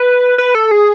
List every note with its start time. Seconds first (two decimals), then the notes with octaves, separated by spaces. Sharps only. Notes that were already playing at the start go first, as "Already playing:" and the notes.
Already playing: B4
0.38 B4
0.55 A4
0.71 G#4